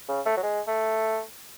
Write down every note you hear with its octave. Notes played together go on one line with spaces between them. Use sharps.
C#3
A3
F#3
G#3
A3